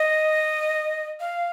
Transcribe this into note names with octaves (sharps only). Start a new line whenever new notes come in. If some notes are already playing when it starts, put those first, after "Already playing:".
Already playing: D#5
F5